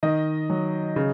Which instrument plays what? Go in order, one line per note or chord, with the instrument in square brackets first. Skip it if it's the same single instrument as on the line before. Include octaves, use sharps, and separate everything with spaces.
[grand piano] D#3 D#5
F#3
C#3